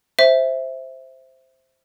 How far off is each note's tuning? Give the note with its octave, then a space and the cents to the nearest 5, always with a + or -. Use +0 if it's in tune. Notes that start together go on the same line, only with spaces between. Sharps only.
C5 +0 E5 +0